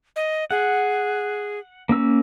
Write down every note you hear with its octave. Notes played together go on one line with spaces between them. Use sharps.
D#5
G#4 F#5
A#3 C#4 E6